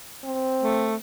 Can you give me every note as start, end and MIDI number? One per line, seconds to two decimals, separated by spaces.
0.24 0.98 60
0.63 0.95 57